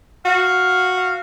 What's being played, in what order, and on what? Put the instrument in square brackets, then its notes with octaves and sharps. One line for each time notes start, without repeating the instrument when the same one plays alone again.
[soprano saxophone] F#4 [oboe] F5
[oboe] F5